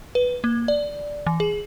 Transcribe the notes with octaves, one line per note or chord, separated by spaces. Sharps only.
B4
A#3
D5
E3
G#4